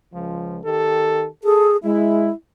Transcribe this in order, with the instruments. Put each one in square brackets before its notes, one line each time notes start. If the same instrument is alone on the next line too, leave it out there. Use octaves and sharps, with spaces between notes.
[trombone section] C#2 F3
D#3 G4 A4
[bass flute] G#4 [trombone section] A4
[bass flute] G#3 [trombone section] E4